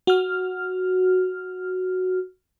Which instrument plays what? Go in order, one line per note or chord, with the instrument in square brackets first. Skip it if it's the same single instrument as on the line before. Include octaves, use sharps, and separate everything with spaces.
[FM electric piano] F#4 F6